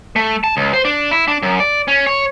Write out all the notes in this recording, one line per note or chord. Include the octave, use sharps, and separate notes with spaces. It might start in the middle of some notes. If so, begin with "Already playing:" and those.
A3
A5
C#2
C5
D4
E4
D4
F#2
D5
C#4
C#5